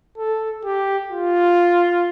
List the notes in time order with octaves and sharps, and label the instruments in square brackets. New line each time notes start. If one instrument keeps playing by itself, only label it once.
[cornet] A4
G4
F4